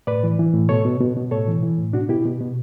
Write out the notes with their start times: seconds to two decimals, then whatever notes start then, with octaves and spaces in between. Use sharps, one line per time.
0.07 A2 B4 D5
0.23 E3
0.39 E3
0.53 A2
0.69 B2 A4 C#5
0.85 B2
1.00 B2
1.16 B2
1.31 A2 A4 C#5
1.48 E3
1.63 E3
1.78 A2
1.93 B2 D4 F#4
2.09 B2 E4 G4
2.25 B2
2.41 B2